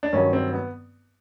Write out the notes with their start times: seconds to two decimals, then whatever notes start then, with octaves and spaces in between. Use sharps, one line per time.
0.03 D4
0.13 G2 D#3 F#3 C#4
0.33 C4
0.53 B3